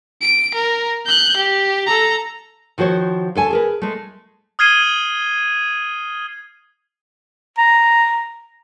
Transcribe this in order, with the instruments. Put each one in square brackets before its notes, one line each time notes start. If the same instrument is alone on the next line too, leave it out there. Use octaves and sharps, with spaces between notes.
[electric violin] D7
A#4
F#6 G6
G4
A4 A#5
[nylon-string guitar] D#3 F3 F#4 C5 C#5
D2 A4 G#5 A5
G#4 A#4 B4
G#3 A3
[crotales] D#6 F6 G#6 C7 D#7 G7
[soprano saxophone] A#5